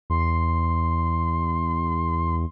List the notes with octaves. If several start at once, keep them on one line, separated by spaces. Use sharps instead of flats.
E2 C6